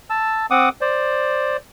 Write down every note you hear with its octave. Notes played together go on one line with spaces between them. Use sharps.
A5 E6
C4 F#5 D6 D#6
C5 D5